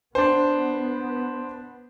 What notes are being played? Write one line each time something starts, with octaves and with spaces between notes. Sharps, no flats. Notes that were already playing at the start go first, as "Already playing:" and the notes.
B3 D4 C5